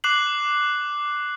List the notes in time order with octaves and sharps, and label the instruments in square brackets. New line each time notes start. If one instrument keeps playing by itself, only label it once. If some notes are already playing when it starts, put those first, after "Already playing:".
[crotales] D6 F#6 C7 F#7